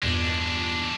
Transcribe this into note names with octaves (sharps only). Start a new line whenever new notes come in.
E2 G2 A#2 G#3 D4